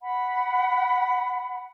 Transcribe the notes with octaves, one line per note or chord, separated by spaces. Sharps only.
F#5 B5